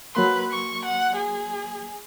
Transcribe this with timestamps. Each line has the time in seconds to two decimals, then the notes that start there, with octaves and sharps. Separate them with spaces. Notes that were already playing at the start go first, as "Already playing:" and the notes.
0.15 F#3 A#3 B4 C6
0.52 C#6
0.85 F#5
1.16 G#4